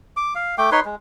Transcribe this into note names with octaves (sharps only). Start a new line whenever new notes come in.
D6
F5
A3 G5 D6
D#4 B4 C#5 C6
G#3